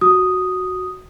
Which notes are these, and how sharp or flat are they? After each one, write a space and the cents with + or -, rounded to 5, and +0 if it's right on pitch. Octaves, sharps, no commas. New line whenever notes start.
F#4 +0 D#6 +0